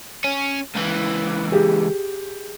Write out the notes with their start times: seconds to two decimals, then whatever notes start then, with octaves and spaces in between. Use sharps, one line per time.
0.24 C#4
0.75 C#2 E3
1.52 G4 G#4